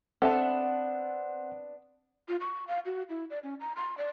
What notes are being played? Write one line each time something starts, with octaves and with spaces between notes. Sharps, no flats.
B3 C4 D4 A4 E5 F#5 A5
F4
C#6
F5
F#4
E4
D5
C#4
A#5
C6
D5